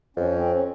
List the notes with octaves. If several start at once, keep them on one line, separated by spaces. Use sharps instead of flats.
F2 C#4
C4
C#4